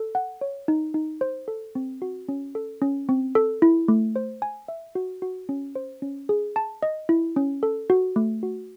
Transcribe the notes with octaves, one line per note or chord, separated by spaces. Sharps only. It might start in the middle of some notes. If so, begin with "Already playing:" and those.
Already playing: A4
F#5
C#5
D#4
D#4
C5
A4
C4
F#4
C#4
A4
C#4
C4
A4
E4
A3
C5
G#5
E5
F#4
F#4
C#4
C5
C#4
G#4
A5
D#5
E4
C#4
A4
F#4
A3
F#4